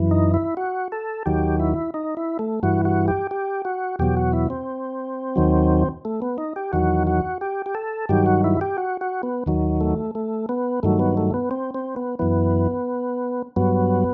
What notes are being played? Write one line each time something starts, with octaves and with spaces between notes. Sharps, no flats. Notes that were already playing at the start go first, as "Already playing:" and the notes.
Already playing: F#2 E3
D#4
E4
F#4
A4
D#2 D#3 F#3 G4
E4
D#4
E4
A3
G2 E3 F#4
F#4
G4
G4
F#4
E2 B2 F#3 G4
F#4
E4
C4
D#2 D#3 F#3
A3
B3
D#4
G4
E2 D#3 F#3 F#4
F#4
G4
G4
A4
G2 D#3 F#3 G4
F#4
E4
G4
F#4
F#4
B3
D#2 D#3 F#3
A3
A3
B3
G2 D#3 F#3 A3
B3
A3
B3
C4
C4
B3
F#2 E3 B3
G2 F#3 B3